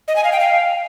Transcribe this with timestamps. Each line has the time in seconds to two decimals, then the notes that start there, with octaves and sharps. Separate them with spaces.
0.08 D#5
0.16 G#5
0.24 F5
0.32 G5
0.40 F5